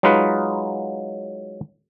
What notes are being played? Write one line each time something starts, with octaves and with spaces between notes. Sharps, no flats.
F#3 G#3 D#4 F4 B4